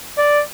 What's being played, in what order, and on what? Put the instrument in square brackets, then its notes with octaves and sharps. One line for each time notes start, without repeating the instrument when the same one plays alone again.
[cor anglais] D5